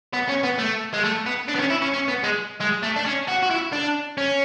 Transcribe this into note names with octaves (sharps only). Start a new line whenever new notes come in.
B3
C#4
B3
A3
G#3
A3
B3
D4
B3
C#4
E4
C#4
C#4
B3
G#3
G#3
A3
D4
C#4
F#4
F#4
E4
D4
C#4